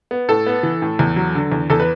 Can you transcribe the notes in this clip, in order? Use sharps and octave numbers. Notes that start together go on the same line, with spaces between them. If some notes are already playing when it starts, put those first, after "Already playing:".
B3
A2 A4
B3
E3
A2
E2
F#3
D3
E2
E2 A4
B4